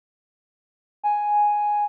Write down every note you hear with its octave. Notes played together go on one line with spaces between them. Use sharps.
G#5